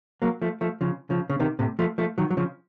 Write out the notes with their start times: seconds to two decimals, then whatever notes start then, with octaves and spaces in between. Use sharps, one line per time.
0.22 F#3 A#3
0.42 F3 A3
0.61 F3 A3
0.81 C#3 F3
1.10 C#3 F3
1.30 C#3
1.40 C3 D#3
1.59 A2 C3
1.79 F3 A3
1.98 F3 A3
2.18 D#3 F#3
2.30 F#3
2.37 C#3 F3